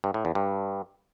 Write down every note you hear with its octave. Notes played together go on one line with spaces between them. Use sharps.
G2
A2
E2
G2